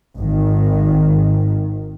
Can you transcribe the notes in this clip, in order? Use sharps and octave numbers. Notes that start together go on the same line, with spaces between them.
G#1 D#3